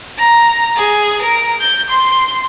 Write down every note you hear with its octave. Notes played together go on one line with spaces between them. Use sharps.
A#5
G#4
A#4
G6
C6